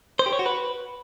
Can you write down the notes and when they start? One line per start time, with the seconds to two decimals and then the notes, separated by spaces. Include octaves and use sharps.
0.19 C5
0.26 G4
0.33 C#5
0.39 F#4
0.46 B4